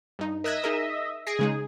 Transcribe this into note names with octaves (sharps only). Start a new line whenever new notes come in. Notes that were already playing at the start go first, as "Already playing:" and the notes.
G2 D#4
A#4 D#5 E5 F#6 G#6
D#4 G#4 A#4
G#4 A#6 C7 D7
C#3 G#3 D#4